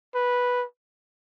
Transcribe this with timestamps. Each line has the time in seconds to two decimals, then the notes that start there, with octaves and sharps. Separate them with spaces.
0.15 B4